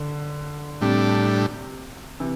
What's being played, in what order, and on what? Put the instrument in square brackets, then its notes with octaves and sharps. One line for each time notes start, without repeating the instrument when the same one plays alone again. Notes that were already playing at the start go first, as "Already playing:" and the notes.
Already playing: [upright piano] D3
[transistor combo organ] A2 G3 D4 [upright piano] C3
[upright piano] C3 E3